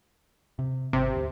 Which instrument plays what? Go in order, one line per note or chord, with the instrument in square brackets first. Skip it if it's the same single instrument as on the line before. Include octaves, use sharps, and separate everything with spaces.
[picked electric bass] C3
[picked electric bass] G#1 [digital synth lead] C3
[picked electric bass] D2